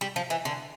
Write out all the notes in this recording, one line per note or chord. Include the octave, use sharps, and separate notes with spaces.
G3
F3
E3
D3